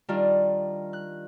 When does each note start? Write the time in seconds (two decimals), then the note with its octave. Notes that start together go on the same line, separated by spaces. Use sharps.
0.09 D#3 G3 D4 F4
0.93 F#6